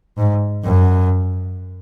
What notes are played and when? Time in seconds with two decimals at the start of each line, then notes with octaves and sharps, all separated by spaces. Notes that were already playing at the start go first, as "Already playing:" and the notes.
0.18 G#2
0.64 F#2